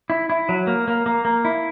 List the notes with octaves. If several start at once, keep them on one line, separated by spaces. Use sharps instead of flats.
E4
E4
F#3
A#3
A#3
A#3
A#3
E4